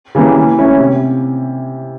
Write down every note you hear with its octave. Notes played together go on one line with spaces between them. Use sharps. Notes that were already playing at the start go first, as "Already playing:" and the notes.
C#3 E3 G3 A#3
E3
A3 C#4 E4
C3